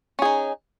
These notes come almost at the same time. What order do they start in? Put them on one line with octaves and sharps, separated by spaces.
C#4 G#4 D#4